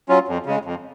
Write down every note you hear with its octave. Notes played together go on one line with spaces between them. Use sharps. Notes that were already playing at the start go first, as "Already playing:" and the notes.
F#3 C#4 F4
F2
C#3 G#3
F2